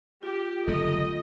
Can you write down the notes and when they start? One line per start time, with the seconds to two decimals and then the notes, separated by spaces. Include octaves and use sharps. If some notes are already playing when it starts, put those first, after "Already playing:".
0.23 F4 G4
0.67 F#1 D3 A3 A4 D#5